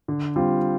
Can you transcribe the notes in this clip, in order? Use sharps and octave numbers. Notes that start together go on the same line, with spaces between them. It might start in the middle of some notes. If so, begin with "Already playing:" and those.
D3
G3 C4 F4